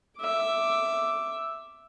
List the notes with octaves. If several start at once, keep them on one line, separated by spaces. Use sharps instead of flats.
E5 D6